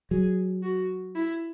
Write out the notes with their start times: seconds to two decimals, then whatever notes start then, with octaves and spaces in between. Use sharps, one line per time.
0.11 F#3 G#4
0.63 F#4
1.15 E4